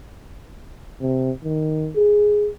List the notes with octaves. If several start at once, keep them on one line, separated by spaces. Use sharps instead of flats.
C3
D#3
G#4